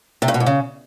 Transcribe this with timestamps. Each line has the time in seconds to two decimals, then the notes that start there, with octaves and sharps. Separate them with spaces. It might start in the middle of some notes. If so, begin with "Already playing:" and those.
0.22 C3
0.28 G2
0.34 B2
0.40 G#2
0.46 C#3